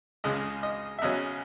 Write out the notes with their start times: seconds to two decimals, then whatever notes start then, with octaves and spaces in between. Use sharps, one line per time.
0.24 C#2 C#3 G#3 D#5
0.63 D#5
0.99 E5
1.02 E2 C#3 F#3 C#4 D#5